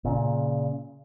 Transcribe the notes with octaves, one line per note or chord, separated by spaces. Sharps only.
A#2 C#3